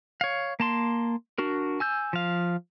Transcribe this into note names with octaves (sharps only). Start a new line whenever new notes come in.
C#5 F5
A#3 A5 C6
D4 F#4 A#4
G#5 E6 G6
F3 F5